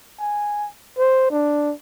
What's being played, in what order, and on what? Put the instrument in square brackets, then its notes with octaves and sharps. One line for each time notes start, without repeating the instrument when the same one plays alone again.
[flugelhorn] G#5
C5
D4